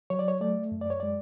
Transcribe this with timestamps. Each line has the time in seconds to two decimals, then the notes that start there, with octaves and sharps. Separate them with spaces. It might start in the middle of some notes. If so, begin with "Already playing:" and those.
0.10 F#3 C#5
0.19 D5
0.28 C#5
0.41 A3 D5
0.72 F#2
0.81 D5
0.90 C#5
1.00 G#3 D5